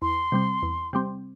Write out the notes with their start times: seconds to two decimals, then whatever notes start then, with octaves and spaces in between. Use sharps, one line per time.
0.02 E2 C6
0.32 C3 G3 C4
0.63 E2
0.93 C3 G3 C4